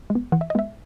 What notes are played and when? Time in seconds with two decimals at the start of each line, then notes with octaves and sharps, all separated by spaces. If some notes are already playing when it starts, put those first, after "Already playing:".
0.10 G#3
0.15 B3
0.32 E3 F#5
0.41 E5
0.50 D#5
0.55 G#3 B3 E5